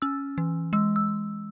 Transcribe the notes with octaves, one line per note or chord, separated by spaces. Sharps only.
C#4 E6
E3
G#3 E6
E6